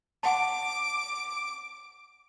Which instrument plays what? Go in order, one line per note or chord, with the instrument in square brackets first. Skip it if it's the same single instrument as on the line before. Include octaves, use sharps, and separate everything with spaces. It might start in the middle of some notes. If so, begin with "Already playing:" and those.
[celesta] F#5 A5 [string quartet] D6